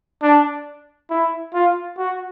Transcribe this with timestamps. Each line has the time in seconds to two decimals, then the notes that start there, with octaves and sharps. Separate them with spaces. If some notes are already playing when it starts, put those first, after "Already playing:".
0.22 D4
1.10 E4
1.53 F4
1.98 F#4